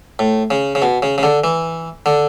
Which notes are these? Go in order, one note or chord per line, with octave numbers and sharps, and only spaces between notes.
A2
C#3
C#3
B2
C#3
C#3
D3
E3
D3